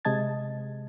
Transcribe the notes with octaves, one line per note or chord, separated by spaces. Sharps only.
C3 G#3 D#5 A5 G#6 A6